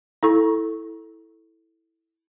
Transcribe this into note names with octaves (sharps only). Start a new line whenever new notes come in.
E4 A4 C#6